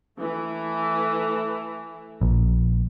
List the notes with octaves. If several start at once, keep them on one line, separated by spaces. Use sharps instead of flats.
E3 A3
A#1